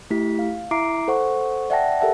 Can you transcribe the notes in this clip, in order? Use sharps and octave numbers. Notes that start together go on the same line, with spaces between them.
A3 E4 G4 B6
F5
E4 E5 A#5 D6 C7 D7
A4 C5 F#5 C#6
D5 E5 F#5 G5 A5 A#6
G4 A4 A#4 E5 F#5 A5